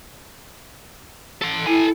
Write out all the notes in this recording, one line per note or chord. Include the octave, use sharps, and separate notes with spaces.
A4 C6
E4 A4 G#5